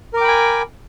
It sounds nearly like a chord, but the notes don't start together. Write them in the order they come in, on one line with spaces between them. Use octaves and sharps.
A#4 D6 G5 B5 G#5